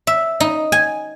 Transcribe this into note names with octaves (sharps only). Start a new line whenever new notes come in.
E5
D#4
G#5